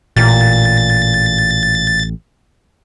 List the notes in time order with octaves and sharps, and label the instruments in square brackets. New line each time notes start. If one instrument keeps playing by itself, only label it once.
[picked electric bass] A1 [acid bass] A#2 [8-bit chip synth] A6